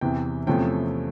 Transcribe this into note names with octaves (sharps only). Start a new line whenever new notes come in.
E2 C3 E3 G5
E2 C3 F3 A3 C#4 G5